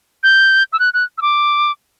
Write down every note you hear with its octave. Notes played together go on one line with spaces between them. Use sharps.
G6
E6
F#6
F#6
E6
D6